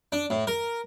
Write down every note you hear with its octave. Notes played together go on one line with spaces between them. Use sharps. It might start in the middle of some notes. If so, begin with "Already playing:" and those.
D4
A2
A#4